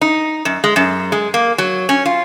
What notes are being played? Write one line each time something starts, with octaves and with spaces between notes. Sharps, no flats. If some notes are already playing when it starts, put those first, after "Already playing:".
D#4
F#2
G#3
F#2
G#3
A#3
F#3
C#4
F4